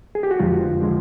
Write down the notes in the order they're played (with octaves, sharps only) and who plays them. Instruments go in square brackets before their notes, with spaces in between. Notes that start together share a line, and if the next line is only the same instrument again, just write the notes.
[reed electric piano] G#4
G4
F#4
F2 D3 F3 G#3 F4
D3 F3 G#3